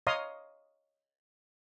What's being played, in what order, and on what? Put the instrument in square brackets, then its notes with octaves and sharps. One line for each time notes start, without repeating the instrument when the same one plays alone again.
[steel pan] C#5 D#5 F5 A#5 C6 D#6